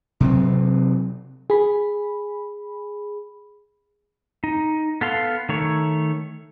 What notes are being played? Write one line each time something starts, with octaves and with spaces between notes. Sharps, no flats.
C3 F#3 C4
G#4 B5
D#4
B3 A4 F5 C6
D#3 A3 C#5